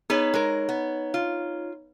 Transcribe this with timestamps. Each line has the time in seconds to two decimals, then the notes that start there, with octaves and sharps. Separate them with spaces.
0.10 B3 D#4 G#4 B4 C#5
0.34 G#3 A#4
0.69 B3
1.14 F4